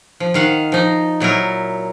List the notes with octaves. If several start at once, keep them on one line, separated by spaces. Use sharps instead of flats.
F3
D#3 F5 F#5
F3 D#4
A#2 F#3 E4 A#4